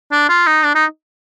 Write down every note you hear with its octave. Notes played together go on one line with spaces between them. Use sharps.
D4
F4
D#4
D4
D#4